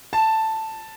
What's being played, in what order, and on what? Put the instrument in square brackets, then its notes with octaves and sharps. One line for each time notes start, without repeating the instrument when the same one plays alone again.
[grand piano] A5